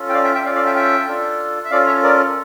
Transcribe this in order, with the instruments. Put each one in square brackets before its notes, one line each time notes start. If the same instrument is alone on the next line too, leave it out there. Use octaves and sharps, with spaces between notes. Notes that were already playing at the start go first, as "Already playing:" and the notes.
Already playing: [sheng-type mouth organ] C#4 F4 A4
G5
D5 F5
E5 G5
E5 G5
C#4 F4 A4 D5 F5
D5 F5
E5 G5
E5 G5
D4 F4 A4
E5
C#4 F4 A4 D5 F5
C#5 E5
A#4 D5